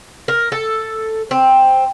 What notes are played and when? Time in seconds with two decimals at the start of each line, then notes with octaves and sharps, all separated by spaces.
0.28 A#4
0.52 A4
1.31 C4